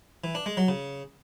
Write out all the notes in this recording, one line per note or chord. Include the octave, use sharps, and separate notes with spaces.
E3
D4
G#3
F#3
C#3